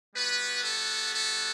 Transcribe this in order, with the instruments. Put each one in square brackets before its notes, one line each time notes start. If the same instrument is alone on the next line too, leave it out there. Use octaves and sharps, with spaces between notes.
[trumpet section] G3 B3 F#4 B4
A4
A4